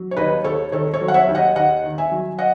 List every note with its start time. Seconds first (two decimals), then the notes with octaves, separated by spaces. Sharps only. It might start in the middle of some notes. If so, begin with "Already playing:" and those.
Already playing: F#3
0.11 C#5
0.17 D#2 B4 D#5
0.44 D#2 A4 C#5
0.72 D#3 A4 C#5
0.94 A4 C#5
1.01 F#3
1.08 F#5
1.14 C#5 E5
1.28 D#2
1.35 D#5 F#5
1.56 D#2 D#5 F#5
1.84 D#3
1.98 E5 G#5
2.11 F#3
2.38 D#5 F#5